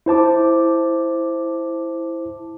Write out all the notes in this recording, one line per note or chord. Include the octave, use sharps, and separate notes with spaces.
E4 C5 A5 D6